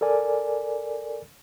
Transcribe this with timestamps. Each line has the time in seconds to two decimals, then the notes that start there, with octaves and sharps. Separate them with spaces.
0.01 A4 A#4 D5 G#5